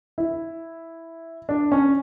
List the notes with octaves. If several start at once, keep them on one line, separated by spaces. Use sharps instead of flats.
E4
D4
C#4